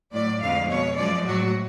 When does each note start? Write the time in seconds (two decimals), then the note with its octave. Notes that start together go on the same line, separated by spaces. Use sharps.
0.13 A2 F#3 D5
0.41 F2 D3 G#3 F5
0.69 B2 G#3 C#5
0.97 F#2 F3 G#3 D5
1.25 A2 F#3 F#4